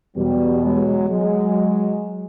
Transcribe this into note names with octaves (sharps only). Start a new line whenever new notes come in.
E2 B2 F#3 G3
F#3 G#3
F#3 G#3